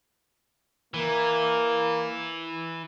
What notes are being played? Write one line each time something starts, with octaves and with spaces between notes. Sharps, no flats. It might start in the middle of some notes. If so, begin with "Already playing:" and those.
E3 A#3